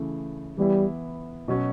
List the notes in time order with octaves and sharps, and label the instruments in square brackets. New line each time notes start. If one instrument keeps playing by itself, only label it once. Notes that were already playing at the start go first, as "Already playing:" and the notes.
Already playing: [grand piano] C#3 E3 A3 E4
[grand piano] E3 B3 E4 [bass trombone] G3
[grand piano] B2 F#3 C#4 F#4